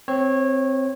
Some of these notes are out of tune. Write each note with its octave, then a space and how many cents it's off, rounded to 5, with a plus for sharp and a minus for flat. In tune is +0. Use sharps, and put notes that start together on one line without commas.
C4 +0 C#5 -20